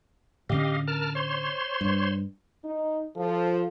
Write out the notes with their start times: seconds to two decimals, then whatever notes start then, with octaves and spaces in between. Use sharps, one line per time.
0.49 A2 D3 C#4 G4 D#5 F5
0.88 A#4 A5 F6
1.15 C5 C#5 C6
1.81 G2
2.65 D#4
3.16 F3 A4